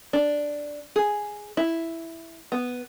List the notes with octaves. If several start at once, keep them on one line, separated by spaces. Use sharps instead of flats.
D4
G#4
E4
B3